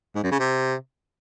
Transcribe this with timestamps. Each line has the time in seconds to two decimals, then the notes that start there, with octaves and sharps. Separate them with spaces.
0.15 G#2
0.23 F#2
0.31 C#3
0.40 C3